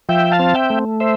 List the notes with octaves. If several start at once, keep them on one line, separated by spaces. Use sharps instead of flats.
F3 E5 G5
F5 A5
C4
E5 G5
A3
C5 E5